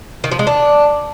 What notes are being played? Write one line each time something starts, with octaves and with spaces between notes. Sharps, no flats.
D#3
F3
G#3
D4